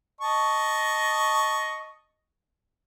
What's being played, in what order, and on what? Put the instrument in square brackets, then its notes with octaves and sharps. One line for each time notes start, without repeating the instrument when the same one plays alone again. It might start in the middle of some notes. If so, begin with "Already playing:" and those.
[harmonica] D#5 A5 C#6